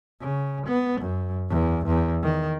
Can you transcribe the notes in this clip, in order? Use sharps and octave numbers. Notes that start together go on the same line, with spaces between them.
C#3
B3
F#2
E2
E2
D#3